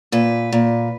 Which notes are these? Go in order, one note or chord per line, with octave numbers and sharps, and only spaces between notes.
A#2 B4
A#2